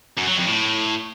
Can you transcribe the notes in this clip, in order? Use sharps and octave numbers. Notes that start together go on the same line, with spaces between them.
F#2
F#3
F2
A2